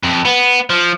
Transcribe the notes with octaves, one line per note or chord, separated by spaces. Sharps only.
F2
B3
F3